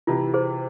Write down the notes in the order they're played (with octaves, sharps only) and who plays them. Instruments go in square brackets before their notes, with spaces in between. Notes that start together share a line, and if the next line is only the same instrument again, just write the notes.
[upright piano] C3 E3 [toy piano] F4
[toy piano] G#4 C5